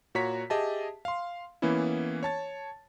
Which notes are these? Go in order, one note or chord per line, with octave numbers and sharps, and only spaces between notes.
A#2 F#4 C#5 A#5 B6
G4 G#4 D#5 E5 A5
F5 C6
E3 A#3 B3 C#4 E4
C#5 A5 A6